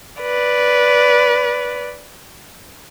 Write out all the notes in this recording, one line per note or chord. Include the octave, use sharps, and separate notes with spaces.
B4 D5